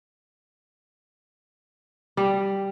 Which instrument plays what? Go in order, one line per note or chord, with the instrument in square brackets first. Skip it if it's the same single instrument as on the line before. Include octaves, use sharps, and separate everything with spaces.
[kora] G3